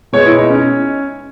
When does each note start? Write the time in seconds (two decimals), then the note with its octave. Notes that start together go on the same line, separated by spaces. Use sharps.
0.13 B2 G#3 B3 C#5
0.26 E4
0.38 D#4
0.50 C#4